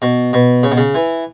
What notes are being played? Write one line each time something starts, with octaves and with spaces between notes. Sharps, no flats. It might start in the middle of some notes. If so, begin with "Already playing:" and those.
B2
B2
C#3
B2
C#3
E3